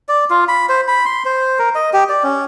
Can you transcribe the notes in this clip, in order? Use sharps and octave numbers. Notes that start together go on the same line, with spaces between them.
D5
F4
B5
C5
B5
C6
C5
A#4
D#5
G4
D5
C#4